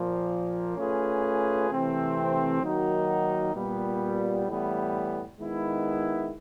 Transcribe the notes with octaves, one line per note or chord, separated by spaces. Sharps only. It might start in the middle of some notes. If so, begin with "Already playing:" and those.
Already playing: A#2 F3 A#3
A3 C#4 F4 G#4 B4
C3 E3 A3 C4
D#3 F#3 A#3 D#4 F#4
A#2 G3 B3
A2 E3 G3 B3
D#3 G#3 B3 E4